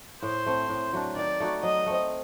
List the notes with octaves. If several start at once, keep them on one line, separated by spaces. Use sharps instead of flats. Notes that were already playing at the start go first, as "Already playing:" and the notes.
A2 C5
A3 C4
A2
F#3 A3 D4
D#3 D5
A3 D#4 F#4
F#3 D#5
A3 C4